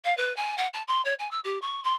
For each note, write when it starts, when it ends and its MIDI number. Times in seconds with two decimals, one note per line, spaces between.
0.04 0.15 77
0.17 0.35 71
0.36 0.55 80
0.58 0.67 78
0.73 0.82 81
0.88 1.02 84
1.05 1.14 73
1.19 1.30 80
1.31 1.39 88
1.44 1.58 67
1.62 1.82 85
1.84 1.94 84